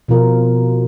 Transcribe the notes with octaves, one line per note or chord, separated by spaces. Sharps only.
B2 F3 F4 A#4